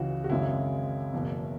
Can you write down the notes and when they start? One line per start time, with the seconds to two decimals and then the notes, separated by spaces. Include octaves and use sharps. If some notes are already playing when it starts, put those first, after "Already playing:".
Already playing: C#2 C#3 E3 F#4
0.24 F#4
0.30 G#1 F#2 C#3 G#3 E4
1.13 F#1 E2 B2